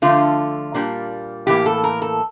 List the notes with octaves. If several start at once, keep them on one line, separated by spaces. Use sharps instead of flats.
D3 F3 A3 F4
A#2 G3 A#3 D4
A2 E3 A#3 G4
A4
A#4
A4